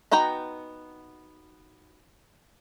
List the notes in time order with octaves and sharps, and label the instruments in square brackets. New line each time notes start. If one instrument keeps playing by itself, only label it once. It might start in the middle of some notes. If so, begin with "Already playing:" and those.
[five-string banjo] B3 D#4 F#4 G5 A#5